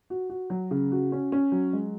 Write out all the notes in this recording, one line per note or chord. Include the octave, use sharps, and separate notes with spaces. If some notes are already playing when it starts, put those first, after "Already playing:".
F#4
F#4
F#3
C#3
F#4
C#4
C#4
F#3
G#3